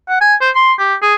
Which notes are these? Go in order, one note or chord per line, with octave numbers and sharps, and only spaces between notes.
F#5
G#5
C5
C6
G4
G#4